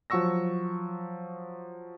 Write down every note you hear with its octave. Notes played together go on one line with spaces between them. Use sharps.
F3 F#3 F#5 C#6 E6 A#6